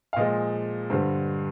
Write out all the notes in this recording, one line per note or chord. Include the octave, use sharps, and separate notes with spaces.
F5
A#2 F3 G#3 D#5
G2 D3 G3 C5